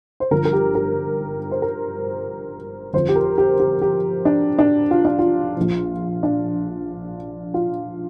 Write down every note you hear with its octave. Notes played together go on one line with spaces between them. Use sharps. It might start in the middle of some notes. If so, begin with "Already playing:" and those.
C5
G1 G2 F3 A#4
A#4
G4
A#4
C5
A#4
G1 F2 F3 C5
G4
A#4
G4
G4
G4
D4
D4
F4
D4
F4
A#1 A#2 F3
D4
F4